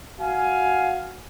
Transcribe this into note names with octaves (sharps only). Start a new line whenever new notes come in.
F#4 F5 G#5